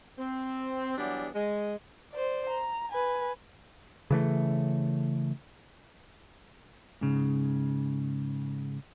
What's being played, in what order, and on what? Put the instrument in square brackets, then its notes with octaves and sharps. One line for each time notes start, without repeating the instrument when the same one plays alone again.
[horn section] C4
E3 F#3 G3 B3 D4 G4
G#3
[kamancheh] C5 D5
A#5
B4 G#5
[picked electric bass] C#3 E3 A3
[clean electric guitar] G#2 C#3